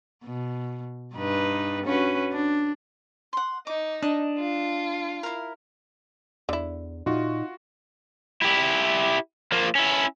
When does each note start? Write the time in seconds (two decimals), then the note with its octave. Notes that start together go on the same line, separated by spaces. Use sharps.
0.24 B2
1.15 G2 D#4 B4
1.85 C#4 F#4 B4
2.32 D4
3.33 F#5 C6
3.67 D#4 D6
4.02 D4 D#5
4.38 F4
5.23 E4 A#4
6.49 E2 D3 E4
7.06 A#2 D#4 F4 F#4
8.42 E4 G4
9.52 F3 A#3
9.75 C#4 E4